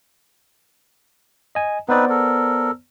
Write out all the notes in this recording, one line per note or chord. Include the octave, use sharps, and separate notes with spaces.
D#5 G#5
B3 C4 D#4 B4 C5 D5
A4 A#4